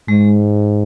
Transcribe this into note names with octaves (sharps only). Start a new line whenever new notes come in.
G#2 G#3